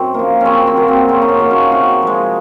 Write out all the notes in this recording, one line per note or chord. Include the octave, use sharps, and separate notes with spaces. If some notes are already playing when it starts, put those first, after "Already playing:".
Already playing: F#2 C4 D#4
F3 A#3
C#3 C4 C#4
C4
F#3 A#3
C4
C#3 C#4
D#4
C#4
F#3 A#3
C#4 F4
C3 D#4 F#4
F3 G#3